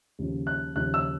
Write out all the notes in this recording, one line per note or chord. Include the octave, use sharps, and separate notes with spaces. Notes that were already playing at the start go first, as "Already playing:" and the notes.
D#2 C#3 F3
F#6
D#2 C#3 F3 F#6
E6